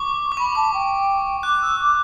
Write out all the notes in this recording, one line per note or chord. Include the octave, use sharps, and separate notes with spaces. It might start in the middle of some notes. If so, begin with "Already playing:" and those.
Already playing: C#6 D6
D6
B5 C#6
A5 D6
G5
D6 F#6
E6
D6